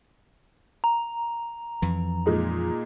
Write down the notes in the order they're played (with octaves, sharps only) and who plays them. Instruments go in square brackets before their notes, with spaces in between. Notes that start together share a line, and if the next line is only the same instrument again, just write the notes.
[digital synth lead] A#5
[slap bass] F2 E3
[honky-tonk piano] A#2 G#3 D#4